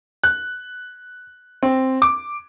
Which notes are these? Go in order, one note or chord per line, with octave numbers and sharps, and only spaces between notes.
F#6
C4
D6